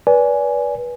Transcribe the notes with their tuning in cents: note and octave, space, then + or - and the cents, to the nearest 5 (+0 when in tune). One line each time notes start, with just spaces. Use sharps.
B4 -25 D5 -30 G#5 +0